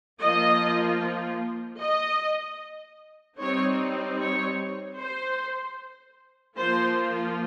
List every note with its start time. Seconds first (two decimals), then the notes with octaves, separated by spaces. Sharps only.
0.22 F3 A#3 F4 D#5
1.81 D#5
3.39 G3 C4 D#4 C#5
4.19 C#5
4.99 C5
6.57 F3 A#3 F4 C5